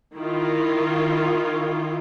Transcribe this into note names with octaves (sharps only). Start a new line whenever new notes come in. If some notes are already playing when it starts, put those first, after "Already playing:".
D#3 E4 F4